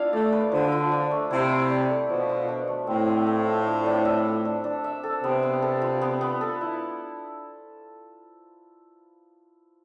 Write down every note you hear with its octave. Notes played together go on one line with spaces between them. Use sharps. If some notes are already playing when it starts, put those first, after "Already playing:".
Already playing: B3 D4 E4 F4 F5
A3 D5
B4
D3 F3
F4
D4
A3
C3 E4
E4
D5
A4
B2 F3
F4
D4
A3
A2 C4
C4
A4
F4
D4
D4
E5
A4
D4
D4
E5
A4
C3 B3
B3
A4
F4
B3
B3
A4
E4